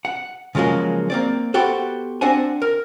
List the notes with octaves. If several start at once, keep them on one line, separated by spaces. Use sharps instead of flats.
F#5
C#3 F3 F#3 G#3 A#3
A#3 C4 D5
B3 F#4 G4 A4 C5
C4 D4 C5 F#5 G#5
A#4